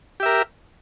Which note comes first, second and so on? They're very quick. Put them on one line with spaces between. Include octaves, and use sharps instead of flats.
G4 E5 A#4